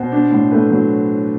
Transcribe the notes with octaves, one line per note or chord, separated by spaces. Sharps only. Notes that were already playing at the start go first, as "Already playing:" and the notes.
Already playing: B2 C5
D4
A2
A3 B4
F#3